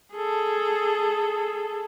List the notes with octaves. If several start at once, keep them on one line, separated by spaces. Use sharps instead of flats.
G#4 A4